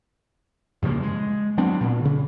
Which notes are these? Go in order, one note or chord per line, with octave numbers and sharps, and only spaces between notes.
G2 C#3 F3 A#3
G#3
F#3 B3 C4 D4
A#2
C#3